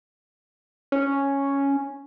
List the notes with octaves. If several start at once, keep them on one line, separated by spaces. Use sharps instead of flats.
C#4